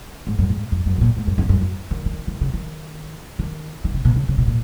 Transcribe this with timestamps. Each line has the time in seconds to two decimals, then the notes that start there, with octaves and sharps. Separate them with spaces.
0.27 G#2
0.38 F#2
0.50 G#2
0.72 F2
0.86 F#2
0.98 B2
1.01 A#2
1.17 G#2
1.27 F#2
1.38 F2
1.49 F#2
1.61 F#2
1.91 D#3
2.06 D#3
2.27 D#3
2.41 C#3
2.54 D#3
3.39 D#3
3.84 D#3
3.94 C#3
4.05 B2
4.16 C#3
4.29 C#3
4.38 B2
4.47 A#2